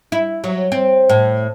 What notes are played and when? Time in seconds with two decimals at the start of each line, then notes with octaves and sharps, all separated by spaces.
0.12 E4
0.44 F#3
0.72 C4
1.09 A2